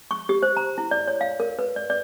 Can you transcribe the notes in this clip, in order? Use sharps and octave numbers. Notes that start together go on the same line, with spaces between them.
C#6
G4
C5
A#5
E4
D5
C#5
F5
A#4
B4
D5
D5